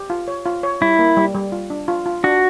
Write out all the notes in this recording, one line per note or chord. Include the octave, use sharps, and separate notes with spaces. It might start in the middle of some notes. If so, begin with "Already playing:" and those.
Already playing: G4
F4
C#5
F4
C#5
G3 E4
A#3
G3
G3
F4
D4
F4
F4
D4 F#4